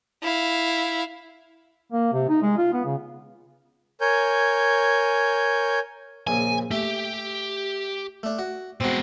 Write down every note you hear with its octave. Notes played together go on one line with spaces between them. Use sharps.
E4 F5
A#3
C3
D#4
G#3
F4
B3
C#3
A#4 C#5 G#5 G6
A#1 C#3 G#5
A3 G4
A3 D4
F#4
B2 G#3 C4 F#4